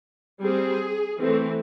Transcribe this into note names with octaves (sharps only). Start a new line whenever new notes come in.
G3 C4 G#4
E3 A3 C4